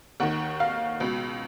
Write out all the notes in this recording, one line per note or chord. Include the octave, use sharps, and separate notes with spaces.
D#2 D#3 F#5
F5
C#2 B2